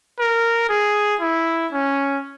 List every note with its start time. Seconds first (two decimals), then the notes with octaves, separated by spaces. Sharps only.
0.19 A#4
0.69 G#4
1.21 E4
1.72 C#4